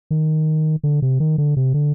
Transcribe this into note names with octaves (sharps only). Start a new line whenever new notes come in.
D#3
D3
C3
D#3
D3
C3
D3